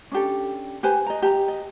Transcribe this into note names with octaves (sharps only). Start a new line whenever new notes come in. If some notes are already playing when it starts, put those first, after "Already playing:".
C#4 D4 G4 A4
G4 B4 C5 G#5
D#5 A#5
G4 A5 A#5
D#5